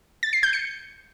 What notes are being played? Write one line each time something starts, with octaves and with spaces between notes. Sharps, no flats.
A6
C7
G6
C#7